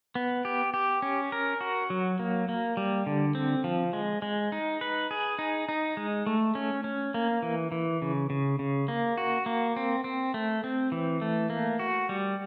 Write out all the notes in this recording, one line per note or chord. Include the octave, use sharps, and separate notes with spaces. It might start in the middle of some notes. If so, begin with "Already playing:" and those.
B3
G4
G4
C#4
A#4
F#4
F#3
A#3
A#3
G3
D3
C4
F3
G#3
G#3
D#4
B4
G#4
D#4
D#4
G#3
A3
C#4
C#4
A#3
E3
E3
C#3
C#3
C#3
A#3
F#4
A#3
C4
C4
A3
C4
E3
A3
A#3
F#4
G3